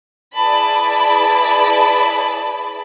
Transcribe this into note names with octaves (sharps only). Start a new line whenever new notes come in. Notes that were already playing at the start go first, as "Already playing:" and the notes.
E4 G#4 B4 D5 A5 B5